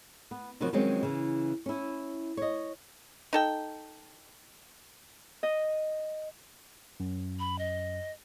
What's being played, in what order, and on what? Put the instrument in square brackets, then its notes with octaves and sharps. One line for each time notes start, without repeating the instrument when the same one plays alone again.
[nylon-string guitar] B3
C3 D#3 F3 F#3 B3 F#4
D#3 F3 F#3 G#3 C4 C#4
C#3 E3
C#4 E4
C#5 D#5
[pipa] D#4 A4 G5
[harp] D#5
[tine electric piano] F#2
[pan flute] B5
D#5